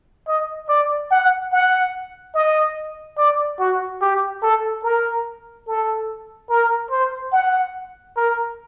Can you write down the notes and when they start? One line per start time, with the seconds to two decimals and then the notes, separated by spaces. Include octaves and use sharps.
0.28 D#5
0.69 D5
1.11 F#5
1.52 F#5
2.35 D#5
3.18 D5
3.60 F#4
4.02 G4
4.43 A4
4.84 A#4
5.67 A4
6.50 A#4
6.91 C5
7.32 F#5
8.16 A#4